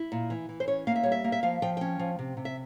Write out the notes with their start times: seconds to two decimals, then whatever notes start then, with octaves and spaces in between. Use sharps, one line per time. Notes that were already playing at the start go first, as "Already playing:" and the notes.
Already playing: E4
0.12 A#2
0.30 E3
0.49 E3
0.60 C5
0.68 C#4 C#5
0.87 A#3 F5
0.96 E5
1.03 G3 C#5
1.12 E5
1.24 A#3
1.32 E5
1.43 F3 F5
1.62 F3 G5
1.77 C#4 G5
1.99 F3
2.19 C3
2.37 C3
2.45 E5